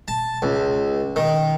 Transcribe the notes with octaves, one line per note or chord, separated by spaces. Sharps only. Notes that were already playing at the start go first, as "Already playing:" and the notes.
A5
C#2
D#3